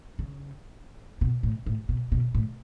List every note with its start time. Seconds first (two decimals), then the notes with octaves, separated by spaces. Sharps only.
0.19 C#3
1.21 B2
1.43 A2
1.66 A2
1.89 B2
2.12 B2
2.35 A2